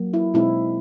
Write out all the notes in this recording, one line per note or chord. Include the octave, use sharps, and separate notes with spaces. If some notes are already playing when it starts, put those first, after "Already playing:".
Already playing: F#3 A#3
E4
B2 G#3 C4 D#4 E4